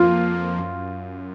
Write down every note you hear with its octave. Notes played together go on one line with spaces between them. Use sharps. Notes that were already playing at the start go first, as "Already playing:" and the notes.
Already playing: F2 F3 A#3 F4
F2
F3 A#3
F#2